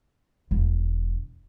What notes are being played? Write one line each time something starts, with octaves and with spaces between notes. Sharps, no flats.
E1